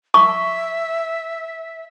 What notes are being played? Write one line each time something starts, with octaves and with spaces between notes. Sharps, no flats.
E5 C#6